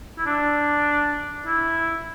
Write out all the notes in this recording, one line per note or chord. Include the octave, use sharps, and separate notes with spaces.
E4
D4
E4